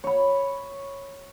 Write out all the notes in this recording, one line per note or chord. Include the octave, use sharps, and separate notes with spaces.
C#5 B5